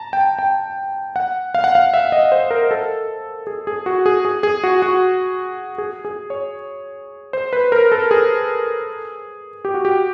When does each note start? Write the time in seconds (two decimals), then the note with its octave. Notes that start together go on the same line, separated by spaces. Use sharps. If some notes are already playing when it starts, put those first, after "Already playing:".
Already playing: A5 A#5
0.13 G5
0.39 G5
1.16 F#5
1.55 F5
1.64 F#5
1.75 F5
1.94 E5
2.12 D#5
2.32 C5
2.51 A#4
2.71 A4
3.47 G#4
3.67 G#4
3.86 F#4
4.06 G#4
4.25 G#4
4.43 G#4
4.64 F#4
4.82 F#4
5.78 G#4
6.05 G#4
6.30 C#5
7.33 C5
7.53 B4
7.72 A#4
7.92 A4
8.11 G#4
9.65 G4
9.74 F#4
9.85 G4